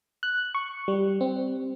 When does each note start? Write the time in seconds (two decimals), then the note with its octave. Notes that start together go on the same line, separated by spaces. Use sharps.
0.23 F#6
0.55 C#6
0.88 G3
1.21 C4